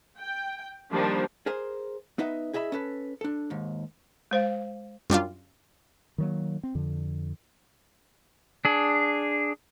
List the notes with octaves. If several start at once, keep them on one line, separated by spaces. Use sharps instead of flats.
G5
D#3 F3 G3 A#3 D4
G#4 A#4 C5 G#5
B3 D#4 B4 D#5 E5
E4 G#4 D#5 E5 B5
C#4 A4 B4
D4 A4
D#2 G#2
G#3 C5 F5
F#2 G3 D4 F4
D#3 F#3 A#3
C4
F2 D3
D4 G#4